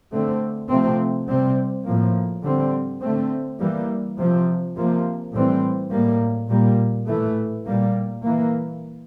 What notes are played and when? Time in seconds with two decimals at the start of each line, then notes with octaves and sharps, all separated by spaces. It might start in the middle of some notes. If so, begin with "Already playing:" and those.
0.12 D3 A3 C4
0.69 C3 F3 A3 C4
1.28 C3 G3 C4
1.85 A2 F3 A#3
2.43 D3 G3 C4
3.01 D3 A3 C4
3.60 E3 G3 A#3
4.18 C3 F3 C4
4.76 C3 F3 A#3
5.34 A2 E3 G3 C4
5.91 A2 G3 A#3
6.49 A#2 G3 A#3
7.07 A2 E3 A3
7.66 A#2 G3 A#3
8.23 E3 A#3